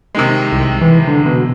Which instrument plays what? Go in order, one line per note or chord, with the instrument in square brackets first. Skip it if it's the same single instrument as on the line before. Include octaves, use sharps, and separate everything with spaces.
[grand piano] C3 D#3 G#3
[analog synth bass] C2
E3
D3
B2